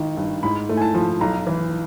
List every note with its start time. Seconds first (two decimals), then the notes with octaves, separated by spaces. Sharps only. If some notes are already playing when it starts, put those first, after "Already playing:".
Already playing: G#1 D#3
0.17 G2
0.43 G#2 B5
0.69 A3
0.77 G#5
0.82 A5
0.95 F3
1.21 B1 A#5
1.47 E3